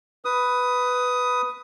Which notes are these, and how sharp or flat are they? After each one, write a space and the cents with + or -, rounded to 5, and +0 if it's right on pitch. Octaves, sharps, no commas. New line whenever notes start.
B4 +5 D#6 +10